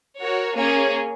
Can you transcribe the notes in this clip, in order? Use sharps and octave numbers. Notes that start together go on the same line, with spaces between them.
F#4 A#4 C#5
A#3 C#4 G#4 C#5